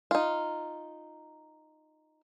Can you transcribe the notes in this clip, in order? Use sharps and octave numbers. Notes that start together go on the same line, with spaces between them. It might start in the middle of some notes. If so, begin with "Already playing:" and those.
D#4 F4